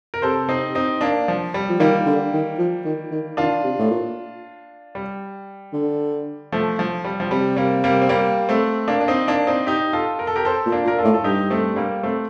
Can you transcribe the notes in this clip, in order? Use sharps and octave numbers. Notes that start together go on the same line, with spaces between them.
A#4
C3 A4 C5
C4 D#4
C4 D#4
A#3 D4
F3
G3
F3
D#3 G3 A#3
D3
D#3
F3
D#3
D#3
D#3 D4 F4
C3
A2
A#2
G3
D3
F3 A3
F3
G3
F3
C3 G3
G3 A#3
G3 A#3
C4
G3 A#3
A3 C4
A#3 D4
D4
C4 D#4
A#3 D4
C4 D#4
D#4 G4
F4 A4
A#4
A4
G4 A#4
A4 C5
A#2
A#3 D4
A#2
A#4
F4 A4
A2
A4
G2 D#4 G4
A3 C4
G3 A#3
A3 C4